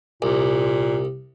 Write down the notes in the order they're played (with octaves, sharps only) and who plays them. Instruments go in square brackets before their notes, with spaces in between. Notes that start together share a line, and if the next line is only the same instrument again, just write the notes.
[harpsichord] C2 [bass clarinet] A#2